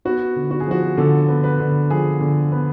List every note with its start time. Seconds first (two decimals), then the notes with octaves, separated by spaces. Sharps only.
0.05 B3 F#4
0.36 D3
0.51 F#4
0.60 G#4
0.67 F3 F#4
0.98 D3 A4
1.28 B3
1.44 B4
1.60 D3
1.90 F3 G#4
2.21 D3
2.52 B3